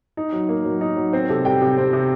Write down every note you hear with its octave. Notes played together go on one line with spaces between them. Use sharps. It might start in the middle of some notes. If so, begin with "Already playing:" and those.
D#4
F#3
A#3
F#3
D#4
F#3
C4 C5
C3 A4
G3 G5
C3
C4
C3